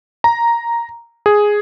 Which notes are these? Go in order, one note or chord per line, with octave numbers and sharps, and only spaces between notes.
A#5
G#4